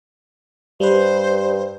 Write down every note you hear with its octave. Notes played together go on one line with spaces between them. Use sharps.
G2 G3 B4 C5